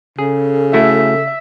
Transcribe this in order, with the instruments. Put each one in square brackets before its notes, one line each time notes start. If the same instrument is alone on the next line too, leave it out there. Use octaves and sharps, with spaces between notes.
[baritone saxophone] C#3 [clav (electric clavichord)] G#4 [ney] A4
[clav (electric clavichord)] A3 E4 F#4 [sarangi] E5